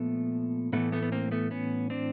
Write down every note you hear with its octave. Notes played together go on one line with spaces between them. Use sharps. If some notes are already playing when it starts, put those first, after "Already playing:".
Already playing: A#2 F3 A3 B3
A2 E3 A3 B3
A3 B3
B3
A#3 C4
A3 B3
B3 C#4
C4 D4